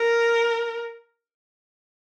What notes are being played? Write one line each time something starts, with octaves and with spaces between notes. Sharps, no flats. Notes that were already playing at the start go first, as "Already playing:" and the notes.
Already playing: A#4